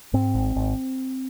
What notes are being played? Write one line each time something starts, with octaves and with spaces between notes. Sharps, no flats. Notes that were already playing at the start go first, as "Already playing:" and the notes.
G#2 C4
G#1
G#1